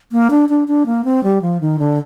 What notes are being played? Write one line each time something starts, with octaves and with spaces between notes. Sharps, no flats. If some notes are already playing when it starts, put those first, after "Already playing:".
A#3
D4
D4
D4
A#3
C4
G3
F3
D#3
D3